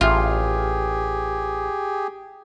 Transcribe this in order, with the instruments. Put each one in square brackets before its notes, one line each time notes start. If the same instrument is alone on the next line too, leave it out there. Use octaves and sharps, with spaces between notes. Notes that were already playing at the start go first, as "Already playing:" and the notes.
[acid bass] A1 [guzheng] F4 [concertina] G4 G#4